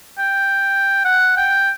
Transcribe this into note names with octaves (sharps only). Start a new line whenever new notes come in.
G5
F#5
G5